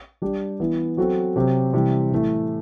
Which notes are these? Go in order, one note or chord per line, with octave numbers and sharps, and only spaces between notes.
G3 D4 G4
E3 B3 E4
F#3 C4 F#4 A4
C3 F#3 C4 G4
C3 E3 G3
A2 E3 A3